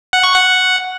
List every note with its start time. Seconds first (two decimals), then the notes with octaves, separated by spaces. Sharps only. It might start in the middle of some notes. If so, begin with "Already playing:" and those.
0.13 F#5
0.23 C#6
0.34 F#5